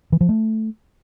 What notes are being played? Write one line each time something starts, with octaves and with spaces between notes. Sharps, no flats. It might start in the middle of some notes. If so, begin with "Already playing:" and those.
E3
F3
A3